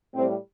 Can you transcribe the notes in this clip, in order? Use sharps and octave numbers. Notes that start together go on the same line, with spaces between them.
A2 G3 C4